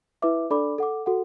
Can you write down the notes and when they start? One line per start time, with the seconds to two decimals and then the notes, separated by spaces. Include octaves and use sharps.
0.22 E4 B4 E5 D6
0.50 D4 A4 D5 B5 D6
0.78 A4 F#5 D6
1.06 F#4 A4 F#5